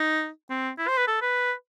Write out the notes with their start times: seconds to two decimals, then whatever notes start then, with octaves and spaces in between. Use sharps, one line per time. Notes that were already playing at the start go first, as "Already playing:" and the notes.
Already playing: D#4
0.50 C4
0.78 E4
0.88 C5
0.97 B4
1.07 A4
1.22 B4